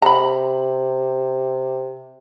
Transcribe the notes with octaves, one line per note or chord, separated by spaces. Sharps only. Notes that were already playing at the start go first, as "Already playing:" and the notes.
C3 A#5 B5